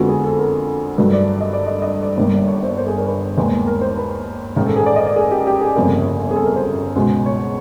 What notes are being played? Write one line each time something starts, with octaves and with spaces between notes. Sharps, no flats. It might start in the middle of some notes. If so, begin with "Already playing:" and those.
Already playing: F2 D3 F3 G#3 B3 F#4
G#4
A4
A#4
G2 D#3 F#3 A3 B4
D5
D#5
D5
D#5
D#5
D5
D5
G1 G2 D#3 G3 A#3
C#5
C5
C5
G#4
A#4
B4
D#2 D#3 G#3 B3
A#4
C5
B4
A1 G#2 D#3 A#4
A4
G#4
D5
D#5
D5
G#4
G4
G4
G#4
G1 F2 C#3 F3 A#3
G#4
A4
A#4
C5
C#2 B2 G#3 B3
C#5